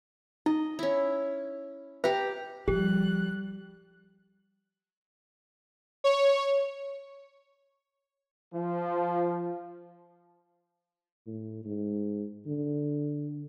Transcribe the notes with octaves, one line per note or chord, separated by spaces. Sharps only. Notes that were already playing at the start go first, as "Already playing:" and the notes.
D#4 D#5
C#4 E4
G4 B4 E5 A#5
F3 G3 G4 F#6
C#5
F3
A2
G#2
D3